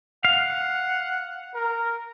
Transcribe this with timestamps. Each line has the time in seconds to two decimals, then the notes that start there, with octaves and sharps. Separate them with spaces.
0.25 F5 F#5
1.55 A#4